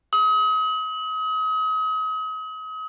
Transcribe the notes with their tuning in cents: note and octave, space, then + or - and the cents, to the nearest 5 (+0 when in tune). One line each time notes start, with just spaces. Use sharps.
D#6 +35